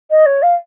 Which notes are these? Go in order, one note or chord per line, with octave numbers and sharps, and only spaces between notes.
D#5
C#5
F5